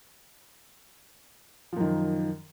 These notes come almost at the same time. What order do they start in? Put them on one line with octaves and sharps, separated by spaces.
F3 F#2 D#3